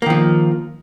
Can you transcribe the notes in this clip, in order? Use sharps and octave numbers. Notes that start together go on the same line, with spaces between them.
D#3 F3 A#3